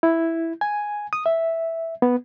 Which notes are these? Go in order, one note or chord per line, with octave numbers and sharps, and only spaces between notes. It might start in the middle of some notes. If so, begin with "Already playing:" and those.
E4
G#5
D#6
E5
B3